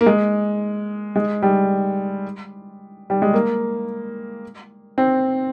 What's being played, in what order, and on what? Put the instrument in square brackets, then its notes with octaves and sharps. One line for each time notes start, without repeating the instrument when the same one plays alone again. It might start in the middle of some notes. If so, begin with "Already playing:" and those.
[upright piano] A#3
G#3
G#3
G3
G3
G#3
A#3
C4